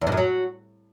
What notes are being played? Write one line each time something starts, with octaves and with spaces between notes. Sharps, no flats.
E2
G2
F#2
F#3